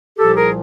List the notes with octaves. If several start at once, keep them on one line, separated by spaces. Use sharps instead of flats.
C2 A#2 F3 G4 A4
G#4 A#4